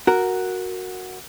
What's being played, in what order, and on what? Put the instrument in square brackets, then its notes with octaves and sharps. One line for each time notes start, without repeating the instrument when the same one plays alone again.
[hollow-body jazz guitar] F#4 A#4